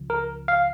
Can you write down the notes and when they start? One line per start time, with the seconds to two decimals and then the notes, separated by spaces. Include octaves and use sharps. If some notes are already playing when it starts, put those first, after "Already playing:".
Already playing: C#2 C#3 F3
0.10 A#4
0.48 F5